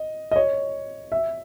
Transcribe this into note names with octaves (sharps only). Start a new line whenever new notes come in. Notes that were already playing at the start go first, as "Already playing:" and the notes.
Already playing: D#5
D#5
C#5
E5